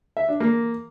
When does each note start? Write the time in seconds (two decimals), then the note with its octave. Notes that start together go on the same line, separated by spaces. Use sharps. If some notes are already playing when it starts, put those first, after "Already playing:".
0.17 E5
0.28 D4
0.40 A#3